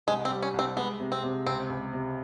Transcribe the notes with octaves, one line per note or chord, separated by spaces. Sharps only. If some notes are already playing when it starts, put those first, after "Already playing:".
C2 G#3
C4
G3
C#4
C2
C4
G#3 B3
C3
C4
C3
C#2 C4
C#2
C3